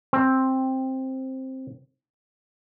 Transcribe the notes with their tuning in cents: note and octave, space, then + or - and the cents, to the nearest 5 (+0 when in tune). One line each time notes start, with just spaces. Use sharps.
C4 +10